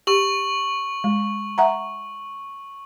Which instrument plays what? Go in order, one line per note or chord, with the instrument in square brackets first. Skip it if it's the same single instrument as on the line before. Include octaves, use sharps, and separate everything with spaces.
[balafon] G4 [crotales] C#6 F#7
[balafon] G#3
E5 F#5 A#5